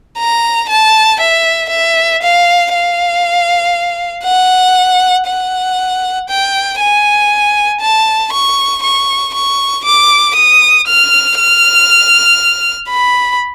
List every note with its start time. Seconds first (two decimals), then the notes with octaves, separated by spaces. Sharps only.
0.18 A#5
0.69 A5
1.20 E5
1.70 E5
2.22 F5
2.73 F5
4.24 F#5
5.27 F#5
6.29 G5
6.80 G#5
7.81 A5
8.33 C#6
8.83 C#6
9.34 C#6
9.85 D6
10.35 D#6
10.87 F6
11.37 F6
12.90 B5